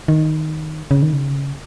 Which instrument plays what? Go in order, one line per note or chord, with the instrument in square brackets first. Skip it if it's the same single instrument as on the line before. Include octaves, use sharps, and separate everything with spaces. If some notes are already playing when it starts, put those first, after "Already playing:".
[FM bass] D#3
C#3
D#3
C#3